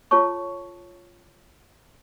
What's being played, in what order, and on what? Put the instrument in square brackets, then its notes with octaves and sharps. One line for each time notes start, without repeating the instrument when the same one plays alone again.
[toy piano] F4 A4 C#5 A5 C#6